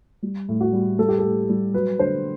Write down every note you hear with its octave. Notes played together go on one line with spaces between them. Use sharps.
G3
A2
F#4
G3
G3 A4
G4
A4
A2
G3
F#3 B4
D3 C5